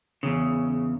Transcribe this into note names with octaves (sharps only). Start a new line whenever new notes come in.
E2 C#3